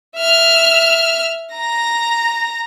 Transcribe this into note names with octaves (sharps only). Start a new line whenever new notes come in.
E5 F6
A#5 A#6